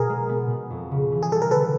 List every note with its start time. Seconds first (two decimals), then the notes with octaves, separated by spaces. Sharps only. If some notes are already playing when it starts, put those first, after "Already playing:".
Already playing: B2 G#4 A#4
0.09 G#3
0.29 B3
0.50 B2
0.70 F2
0.91 C#3
1.12 E3
1.23 G#4
1.31 G3 A4
1.42 A#4
1.51 D3 A4 B4